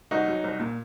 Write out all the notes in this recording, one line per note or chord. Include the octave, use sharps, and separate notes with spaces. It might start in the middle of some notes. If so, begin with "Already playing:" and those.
C2 D#4 F#4
F#3
C2
A#2